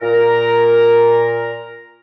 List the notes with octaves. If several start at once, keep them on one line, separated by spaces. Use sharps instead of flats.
A#2 A#4